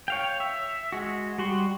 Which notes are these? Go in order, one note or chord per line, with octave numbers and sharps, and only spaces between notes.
C#5 F5 G5
E5
G#3 F#4
G3 F#4 C6